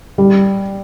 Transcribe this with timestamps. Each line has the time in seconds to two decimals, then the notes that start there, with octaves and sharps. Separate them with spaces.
0.18 G3